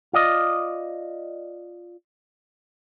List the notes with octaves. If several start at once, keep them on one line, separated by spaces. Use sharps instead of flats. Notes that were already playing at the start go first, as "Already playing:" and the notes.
F4 D5 D#5